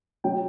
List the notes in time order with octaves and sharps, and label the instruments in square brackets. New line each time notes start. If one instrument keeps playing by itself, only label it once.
[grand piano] F#3 G5